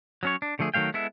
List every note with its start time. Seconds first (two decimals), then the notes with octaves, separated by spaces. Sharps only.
0.23 F#3 C#4 C#5
0.42 D4
0.59 D3 F3 A3 G#4
0.74 D#3 F#3 A3 F5 G5
0.94 G#3 B3 E4 A4 E5